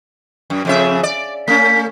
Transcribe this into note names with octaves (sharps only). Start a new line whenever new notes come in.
F#2
F2 C#3 E5
D5
A3 C#4 B6